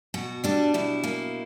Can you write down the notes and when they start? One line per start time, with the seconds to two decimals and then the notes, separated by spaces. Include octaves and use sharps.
0.14 B2 F#4
0.44 G3 D4
0.74 B2 E4
1.04 A#3